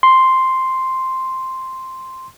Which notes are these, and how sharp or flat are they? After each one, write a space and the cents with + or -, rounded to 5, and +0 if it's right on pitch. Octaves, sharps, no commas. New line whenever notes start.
C6 +0